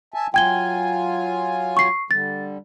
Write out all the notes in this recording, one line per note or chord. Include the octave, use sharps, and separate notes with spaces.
E5 G#5 A5
F#3 F4 G5 G#5 G#6 G7
C#6 C7
D3 G3 A6